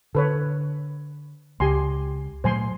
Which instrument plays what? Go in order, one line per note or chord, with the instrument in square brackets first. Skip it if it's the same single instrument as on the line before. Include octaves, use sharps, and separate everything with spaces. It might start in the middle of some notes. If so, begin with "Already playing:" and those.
[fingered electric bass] D3 [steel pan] A4 B4 C#5
[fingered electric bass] C#2 [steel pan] G4 G#5 C6
[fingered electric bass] A#2 F#3 A3 [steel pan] C5 G#5 C6